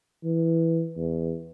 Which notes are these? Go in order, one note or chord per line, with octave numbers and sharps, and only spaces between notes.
E3
E2